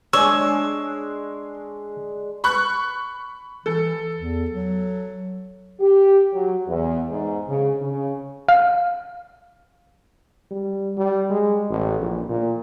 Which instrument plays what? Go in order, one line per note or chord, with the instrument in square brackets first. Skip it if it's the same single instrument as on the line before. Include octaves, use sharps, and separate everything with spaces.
[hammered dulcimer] G#3 D4 [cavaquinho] C#5 [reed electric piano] E6
[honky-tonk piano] B5 C#6 F#6
[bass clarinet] E3 [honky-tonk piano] A4
[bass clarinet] E2
F#3
[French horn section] G4
F#3
E2
G#2
C#3
C#3
[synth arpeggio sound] F5
[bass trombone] G3
G3
G#3
A1
A#1
A#2